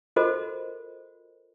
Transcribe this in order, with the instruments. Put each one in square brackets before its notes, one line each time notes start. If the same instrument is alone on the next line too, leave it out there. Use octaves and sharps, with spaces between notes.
[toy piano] F4 F#4 A4 A#4 C5 D#5